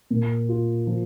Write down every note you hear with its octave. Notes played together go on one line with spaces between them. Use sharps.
A#2
F4
F3